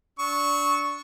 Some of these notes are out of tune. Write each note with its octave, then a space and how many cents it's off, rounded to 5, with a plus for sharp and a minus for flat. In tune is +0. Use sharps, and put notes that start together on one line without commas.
D4 -15 C#6 +0 E6 -30